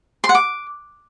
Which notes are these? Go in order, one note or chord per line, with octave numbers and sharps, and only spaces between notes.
C6
F#5
D6